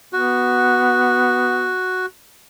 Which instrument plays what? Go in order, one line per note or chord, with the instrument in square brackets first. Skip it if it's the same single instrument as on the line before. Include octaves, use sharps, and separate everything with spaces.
[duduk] B3 [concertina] F#4